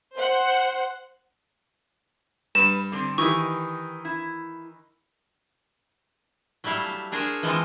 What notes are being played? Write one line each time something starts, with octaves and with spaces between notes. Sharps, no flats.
C5 F#5
G2 B4 E7
D3 C4 D4
D#3 E3 D#4 G4 B4 C#6
E4
F#3 G3 A3 E4 F5
A5
D4 G#4 A#4 C5 C#5
E3 F3 G#3 C4 F4 A4